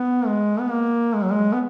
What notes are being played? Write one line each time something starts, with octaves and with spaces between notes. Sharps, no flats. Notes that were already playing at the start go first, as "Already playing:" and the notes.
Already playing: B3
G#3
B3
A#3
G#3
F#3
G#3
B3